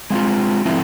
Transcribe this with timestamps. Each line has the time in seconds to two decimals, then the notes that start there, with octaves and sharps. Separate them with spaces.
0.10 G#3 C4 F4
0.65 F3 A3 C4 E4